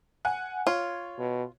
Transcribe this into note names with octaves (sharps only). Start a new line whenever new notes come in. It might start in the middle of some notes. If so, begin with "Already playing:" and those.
F#5 G#5
F4 C#5
B2